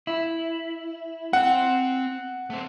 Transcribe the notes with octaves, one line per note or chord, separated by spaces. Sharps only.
E4
C4 F#5 G5
A3 C4